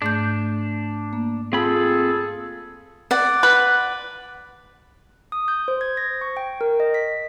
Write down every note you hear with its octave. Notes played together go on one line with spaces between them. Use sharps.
G#2 A3 D4 G6
A#3
C4 F4 G#4 A4 B5
D5 F#5
B4
D#6
G6
C5
G#6
A#6
C#6
G5
A#4
D#5
B6